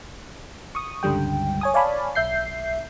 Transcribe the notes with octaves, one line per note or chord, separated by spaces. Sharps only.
C#6 D#6
C#2 G2 D3 G3 G5
C#5 G#5 D#6
C#5 D5 F5 G#5 A5 B5
B1 E5 G6 C7